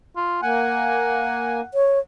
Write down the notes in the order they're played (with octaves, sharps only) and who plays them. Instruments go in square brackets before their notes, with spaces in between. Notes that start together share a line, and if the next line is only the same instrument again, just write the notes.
[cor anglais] F4
[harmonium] A#3 G#5 [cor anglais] F#5
[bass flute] C#5